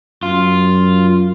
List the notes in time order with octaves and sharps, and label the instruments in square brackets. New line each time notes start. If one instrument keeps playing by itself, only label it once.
[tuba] F#2 [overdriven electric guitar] F4